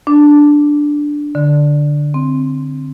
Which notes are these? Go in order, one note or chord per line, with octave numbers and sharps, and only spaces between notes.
D4
D3
C4